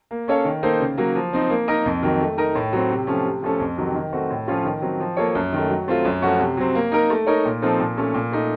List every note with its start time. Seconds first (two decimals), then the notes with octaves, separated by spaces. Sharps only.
0.11 A#3
0.28 C#4 A4 C#5 F5
0.45 D#3
0.63 A#3 D#4 A4 C5
0.80 C#3
0.97 F#3 A#3
1.15 F3
1.33 C4 D#4
1.50 A#3
1.68 D#4 A#4 D#5
1.86 F2
2.03 D#3 F#3
2.21 A3
2.38 D#4 A#4 D#5
2.55 A2
2.73 F#3 C4
2.91 C3
3.07 F3 A3 C#4
3.25 C3
3.42 F3 A3 C#4 A4
3.60 F2
3.77 C3 D#3 F#3
3.95 D#3
4.13 A3 C4 F#4
4.30 A2
4.48 F3 A3 C#4 F4
4.65 D#3
4.82 F#3 C4
5.00 F3
5.17 A#3 F4 A4 C#5
5.35 F#2
5.53 D#3 A3
5.70 F#3
5.88 A3 C4 F4
6.05 F#2
6.22 F3 A3 C#4 F#4
6.40 C3
6.57 F#3 C4
6.75 A#3
6.92 D#4 A#4
7.10 A3
7.26 D#4 A#4 C#5
7.45 A#2
7.62 F3 C4 D#4 A4
7.80 A#2
7.97 A3 C#4 A4
8.14 A#2
8.32 A3 D#4